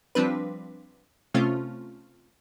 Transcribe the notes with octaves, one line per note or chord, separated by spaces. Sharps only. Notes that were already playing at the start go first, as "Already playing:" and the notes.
F3 G3 C4 D4 B4
C3 A3 C4 C#4 F4